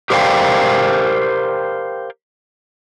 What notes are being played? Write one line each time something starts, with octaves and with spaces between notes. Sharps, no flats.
G4 A#4 C5 D5 F5 G5